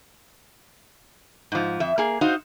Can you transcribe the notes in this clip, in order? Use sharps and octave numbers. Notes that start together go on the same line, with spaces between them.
G#2 F3
F2 E5
A#3 G#4
D#4 F#4 C5 F5